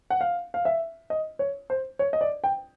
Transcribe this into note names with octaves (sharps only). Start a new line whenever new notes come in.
F#5
F5
F5
E5
D#5
C#5
C5
C#5
D#5
D5
G5